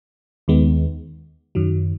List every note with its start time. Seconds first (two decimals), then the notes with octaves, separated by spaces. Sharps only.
0.48 D#2 D#3 G#3 B3
1.55 F#2 D#3 F#3